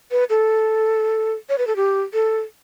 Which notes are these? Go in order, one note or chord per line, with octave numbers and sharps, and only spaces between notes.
B4
A4
C#5
B4
A4
G4
A4